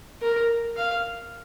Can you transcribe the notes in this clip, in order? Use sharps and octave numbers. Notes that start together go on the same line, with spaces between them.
A#4
F5